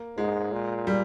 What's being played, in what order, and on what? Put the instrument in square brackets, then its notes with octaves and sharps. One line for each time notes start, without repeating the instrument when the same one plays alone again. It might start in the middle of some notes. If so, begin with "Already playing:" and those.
Already playing: [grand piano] A#3
[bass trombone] G#2 [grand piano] G#3
[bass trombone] A#2
[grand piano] G3